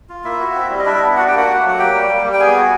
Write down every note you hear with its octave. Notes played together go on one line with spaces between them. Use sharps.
F4
A#3 E4 E5
F#4
C4
G3
D#5
D4 E4 E5
B3
D4 F#4 F#5
G4 G5
A#3 F#4 F#5
A3
F#3
F#5
A#3 G4 G5
G3
A#3
G3
G5
B3 G#4 G#5
F#4